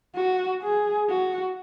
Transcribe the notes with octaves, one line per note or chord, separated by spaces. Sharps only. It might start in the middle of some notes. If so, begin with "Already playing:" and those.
F#4
G#4
F#4